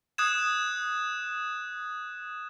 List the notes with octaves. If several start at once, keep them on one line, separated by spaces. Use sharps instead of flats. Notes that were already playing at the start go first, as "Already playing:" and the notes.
D#6 F#6 G#6 E7